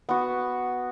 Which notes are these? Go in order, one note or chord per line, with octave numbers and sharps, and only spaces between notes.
B3 F#4